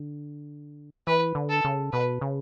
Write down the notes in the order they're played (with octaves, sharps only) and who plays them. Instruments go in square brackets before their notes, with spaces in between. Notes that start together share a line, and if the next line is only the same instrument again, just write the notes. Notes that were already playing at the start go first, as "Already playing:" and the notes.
Already playing: [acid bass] D3
[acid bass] E3 [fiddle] B4
[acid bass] D3
[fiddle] A4
[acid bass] C#3
[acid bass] B2 [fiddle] B4
[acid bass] C#3